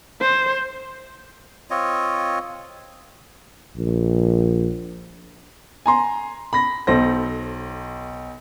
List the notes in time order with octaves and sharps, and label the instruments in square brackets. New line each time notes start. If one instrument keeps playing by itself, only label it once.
[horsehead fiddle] C5
[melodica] C4 F4 C#5 D#5
[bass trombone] A#1
[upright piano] G#5 A#5 C6
B5 A#6
B1 A4 C5 A#6